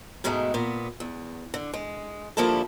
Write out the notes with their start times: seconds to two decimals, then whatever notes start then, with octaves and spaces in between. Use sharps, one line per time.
0.24 G#2 B2 D#3 G#3 A3
0.54 A#2 B3
1.00 E2
1.54 D3
1.74 G#3
2.37 D3 F3 G3 A#3 E4 A4